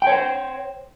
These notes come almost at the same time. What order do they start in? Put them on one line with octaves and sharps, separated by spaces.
G5 C#5 C5